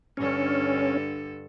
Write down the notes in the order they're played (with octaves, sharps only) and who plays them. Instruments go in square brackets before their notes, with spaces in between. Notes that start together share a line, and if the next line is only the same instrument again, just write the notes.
[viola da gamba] G2 D3 A4 [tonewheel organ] C#4